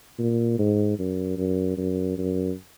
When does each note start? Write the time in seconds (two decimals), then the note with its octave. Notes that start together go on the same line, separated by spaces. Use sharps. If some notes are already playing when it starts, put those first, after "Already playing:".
0.19 A#2
0.59 G#2
0.99 F#2
1.37 F#2
1.77 F#2
2.18 F#2